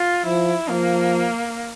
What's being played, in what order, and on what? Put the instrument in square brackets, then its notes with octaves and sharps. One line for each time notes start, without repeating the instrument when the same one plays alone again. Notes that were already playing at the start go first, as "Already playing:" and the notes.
Already playing: [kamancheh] F4
[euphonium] F3 [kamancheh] E4
[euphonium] F3 [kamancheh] A#3